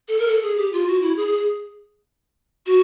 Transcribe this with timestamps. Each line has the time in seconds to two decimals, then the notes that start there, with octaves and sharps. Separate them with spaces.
0.08 A4
0.19 A#4
0.27 A4
0.43 G#4
0.58 G4
0.73 F4
0.87 F#4
1.02 E4
1.16 G#4
1.32 G#4
2.66 F#4